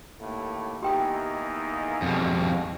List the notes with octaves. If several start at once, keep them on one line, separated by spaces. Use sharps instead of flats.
D#2 A2 A#3
E2 A#3 D#4 G4 G5 D#6
F2 G#2 B2 D3 G3